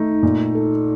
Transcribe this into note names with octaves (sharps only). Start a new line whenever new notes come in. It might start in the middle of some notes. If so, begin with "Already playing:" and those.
Already playing: A3 D#4
A#2
A4